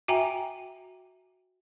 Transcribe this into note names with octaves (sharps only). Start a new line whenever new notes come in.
F#4 E5 G5 G#5 A#5